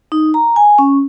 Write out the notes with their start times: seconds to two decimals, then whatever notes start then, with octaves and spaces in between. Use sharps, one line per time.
0.12 D#4
0.34 A#5
0.56 G#5
0.79 C#4